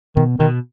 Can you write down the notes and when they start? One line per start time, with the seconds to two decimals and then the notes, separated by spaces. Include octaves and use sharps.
0.16 B2 D#3
0.40 B2 D#3